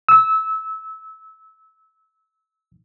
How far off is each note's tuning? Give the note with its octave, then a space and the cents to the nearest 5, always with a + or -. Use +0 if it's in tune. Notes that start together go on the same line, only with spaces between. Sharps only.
E6 -20